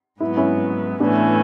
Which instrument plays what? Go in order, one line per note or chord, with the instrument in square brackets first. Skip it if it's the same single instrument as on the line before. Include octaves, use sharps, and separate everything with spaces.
[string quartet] G#2 F#3 B3 [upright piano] E4
[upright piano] C#4 E4
[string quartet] A2 E3 A3 C#4 [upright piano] B3 D4